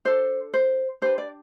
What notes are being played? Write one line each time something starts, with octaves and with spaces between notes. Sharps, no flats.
D4 A4 C5
C5
D4 G4 B4 C5
D5